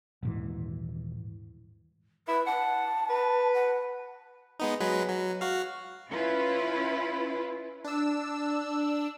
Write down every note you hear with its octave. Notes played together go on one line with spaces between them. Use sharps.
D#1 G#2 E3
E4 B4
F#5 A5
B4
F#5
G#3 B3 D#4
F#3 G#3 B4
F#3
F#4 F5
C#4 E4 F4 B4
D4 E6